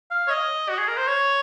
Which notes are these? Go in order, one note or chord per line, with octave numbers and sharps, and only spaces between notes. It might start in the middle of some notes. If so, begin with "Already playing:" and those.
F5
C#5
D#5
F#4
G#4
A#4
C5
C#5